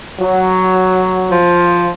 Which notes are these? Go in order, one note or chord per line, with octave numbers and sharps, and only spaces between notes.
F#3
F3